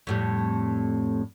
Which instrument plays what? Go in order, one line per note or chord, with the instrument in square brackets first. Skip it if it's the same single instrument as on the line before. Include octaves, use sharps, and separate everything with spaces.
[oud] F2 A2 G3